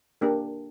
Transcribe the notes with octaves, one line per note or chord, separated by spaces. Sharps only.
A#3 D4 G4 A#4